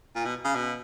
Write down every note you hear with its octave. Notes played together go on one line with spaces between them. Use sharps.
A#2
B2
C#3
B2